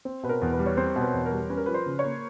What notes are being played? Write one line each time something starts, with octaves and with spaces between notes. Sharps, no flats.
C4
B2 B4
A#4
E2
B4
G3
C#5
C4 C5
B2
B4
E2
A#4
G3
C#4 B4
A#4
F3 B4
C5
C#3
C#5
A#3